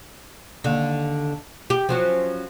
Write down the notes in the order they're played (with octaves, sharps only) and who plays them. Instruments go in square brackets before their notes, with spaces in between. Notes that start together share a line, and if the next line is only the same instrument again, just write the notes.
[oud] D#2 D3
G4
F3 F#3 C#4